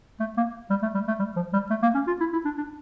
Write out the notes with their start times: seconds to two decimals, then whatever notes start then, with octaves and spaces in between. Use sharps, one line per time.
0.20 A3
0.37 A#3
0.70 G3
0.82 A3
0.94 G3
1.08 A3
1.19 G3
1.36 F3
1.53 G3
1.70 A3
1.82 A#3
1.94 C#4
2.07 F4
2.20 E4
2.33 E4
2.45 D4
2.58 D4